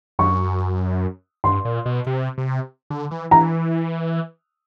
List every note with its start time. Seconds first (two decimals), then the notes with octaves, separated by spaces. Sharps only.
0.19 F#2 C#6
1.44 G2 C6
1.65 A#2
1.86 B2
2.07 C3
2.38 C3
2.90 D3
3.11 E3
3.31 E3 A#5